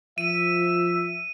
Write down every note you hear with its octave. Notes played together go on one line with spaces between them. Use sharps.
F3 E5 D#7